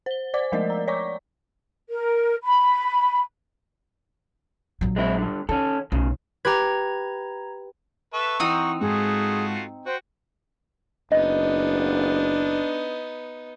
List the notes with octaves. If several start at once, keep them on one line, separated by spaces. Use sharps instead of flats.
C5 G7
C5 D5 D6
F3 G#3 A3 A#4 D5 D#5
A#5
C#5 D5 A#5 C#6 D6
A#4
B5
A#1 F#3
G#3 C4 E4
G2 D3
D#3 C#4 A4
B1 A2 C#3
G4 B4 A#5 G#6
A4 B4 E5 C#6
E3 C4 D#4 F#5 D#6
G#2 A3 F4 F#4 G#4
F#4 C5 G5
F#1 B3 D4 D#4 D#5